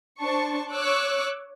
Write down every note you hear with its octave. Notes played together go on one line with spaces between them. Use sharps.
D4 C5 A5 C#6
C#5 C#6 D6 E6 F#6